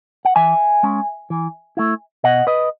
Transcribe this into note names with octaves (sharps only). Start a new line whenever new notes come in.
F#5
E3 E5 G#5
G#3 C#4
E3
A3 E4
B2 D#5 F#5
B4 D#5